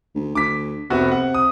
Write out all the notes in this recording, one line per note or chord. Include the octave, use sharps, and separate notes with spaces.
D2
D2 D6 B6
F1 C3 B3 F#4
F#5
D#6